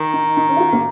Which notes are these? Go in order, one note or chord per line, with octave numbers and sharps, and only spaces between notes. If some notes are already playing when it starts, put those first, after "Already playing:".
Already playing: D#3
D#4
D#4
C#4
F4
F#4
A#3